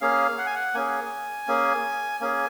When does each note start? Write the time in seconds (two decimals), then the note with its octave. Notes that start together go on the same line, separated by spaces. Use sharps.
0.01 A#3 C#4 G#4 F5
0.38 F#5
0.46 G#5
0.55 F#5
0.74 A#3 C#4 G#4 G#5
1.48 A#3 C#4 G#4
2.21 A#3 C#4 G#4 G#5